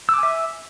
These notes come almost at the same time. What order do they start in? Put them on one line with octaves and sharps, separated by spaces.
E6 D6 G#5 E5